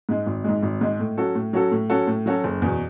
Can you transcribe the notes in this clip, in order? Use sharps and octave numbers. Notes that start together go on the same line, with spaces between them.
G#2 G#3
G#1
G#2 G#3
G#1
G#2 G#3
A2
F#3 C#4 F#4 A4
A2
F#3 C#4 F#4 A4
A2
F#3 C#4 F#4 A4
A2
F#3 C#4 F#4 A4
F#1
E2 B2